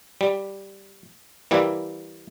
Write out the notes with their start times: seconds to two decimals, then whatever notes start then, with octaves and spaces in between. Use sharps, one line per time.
0.21 G3
1.51 E3 G3 A#3 E4